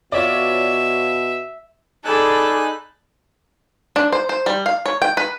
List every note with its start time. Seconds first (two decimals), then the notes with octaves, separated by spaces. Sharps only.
0.12 B2 F4 C#5 D5 E5
2.05 D#4 G#4 A4 D5 G#5 B5 F#6
3.96 D4
4.12 C5
4.29 C5
4.46 G3
4.66 F5
4.86 C#5
5.02 G5
5.17 B4